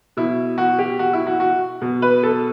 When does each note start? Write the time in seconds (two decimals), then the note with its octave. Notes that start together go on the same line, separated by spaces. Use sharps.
0.17 B2 E4
0.58 F#4
0.79 G4
0.99 F#4
1.13 E4
1.27 F#4
1.40 F#4
1.81 B2
2.02 B4
2.23 A4